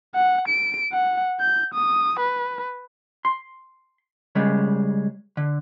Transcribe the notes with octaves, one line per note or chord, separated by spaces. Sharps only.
F#5
D7
F#5
G6
D#6
B4
C6
C#3 G3 G#3
D3